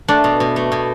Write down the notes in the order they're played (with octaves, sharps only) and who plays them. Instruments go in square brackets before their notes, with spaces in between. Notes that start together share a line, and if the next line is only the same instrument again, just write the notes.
[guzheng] A3 [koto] D4
[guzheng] B2
B2
A3
B2